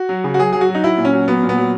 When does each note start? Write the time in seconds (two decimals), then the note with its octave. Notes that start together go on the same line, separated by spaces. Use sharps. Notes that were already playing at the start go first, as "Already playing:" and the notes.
Already playing: F#4
0.09 F#3
0.24 C#3
0.34 F#4
0.39 F#3 G#4
0.53 F#3 G#4
0.61 F#4
0.69 F#3
0.75 D#4
0.84 F#3 E4
0.97 A#2
1.05 C#4
1.13 F#3
1.27 F#3 B3
1.43 A#2
1.49 B3
1.57 F#3